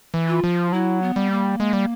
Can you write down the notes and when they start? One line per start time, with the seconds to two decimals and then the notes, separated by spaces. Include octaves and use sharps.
0.14 E3
0.28 F4
0.44 F3
0.72 F#3 E4
1.02 B3
1.16 G3
1.31 A#3
1.60 G#3
1.73 G3